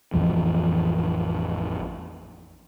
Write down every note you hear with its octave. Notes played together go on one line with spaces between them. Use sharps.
A1 F2 E3 F3